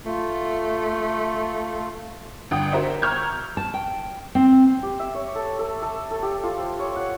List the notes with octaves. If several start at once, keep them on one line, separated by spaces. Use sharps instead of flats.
A3 F4
G1 F#5 G5 D#6
F#4 A#4 C5 E5
A#5 C#6 E6 F6 G6 G#6
A5
G5
C4
G4
E5
C#5
A4
A4
A4
A4
G4
F4
C5
C#5
F#5